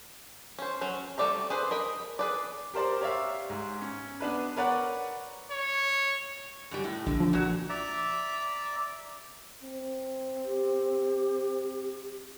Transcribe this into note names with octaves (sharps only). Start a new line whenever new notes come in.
C#4 C5
F#3 C#4
G3 A3 D5 E5 A#5
G#4 B4 C5
A#4 D#5 B5
G#4 B4 D5
G4 A#4 C5 D5
G4 C#5 D5 E5 F5
G#2
C#4
B3 D4 B4
A#4 B4 C#5 D5 F#5
C#5
F#2 G3
A2
A#1 D3
F3
A#2 F#4
D5 E5 A#5
C4
G4